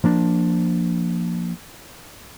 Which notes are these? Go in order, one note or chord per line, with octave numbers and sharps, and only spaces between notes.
F3 A#3 D4